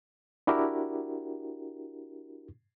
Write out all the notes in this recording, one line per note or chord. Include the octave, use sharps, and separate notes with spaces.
D4 E4 F#4 G4 A#4